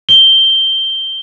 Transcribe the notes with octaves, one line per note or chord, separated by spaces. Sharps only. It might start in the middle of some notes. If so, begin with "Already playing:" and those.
G7